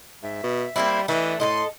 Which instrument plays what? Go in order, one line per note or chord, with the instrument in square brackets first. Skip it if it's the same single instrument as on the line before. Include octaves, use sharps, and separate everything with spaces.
[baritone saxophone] G#2 [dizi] E5
[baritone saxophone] B2
[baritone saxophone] G3 [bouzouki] A#3 C4 E4
[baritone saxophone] E3 [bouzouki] A3 D4 [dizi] D#5
[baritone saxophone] A2 [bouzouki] A4 A#4 D#5 [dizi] C6